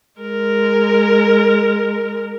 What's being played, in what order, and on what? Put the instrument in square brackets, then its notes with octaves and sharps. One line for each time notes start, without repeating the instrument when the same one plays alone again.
[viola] G#3 A#4